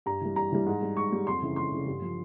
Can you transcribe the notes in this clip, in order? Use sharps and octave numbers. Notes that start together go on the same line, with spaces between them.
G2 A#5
E3 G3
G2 A#5
E3 G3
G#2
G3
G#2 C#6
G3
F2 C6
C#3 E3
F2 C6
C#3 E3
G2
F3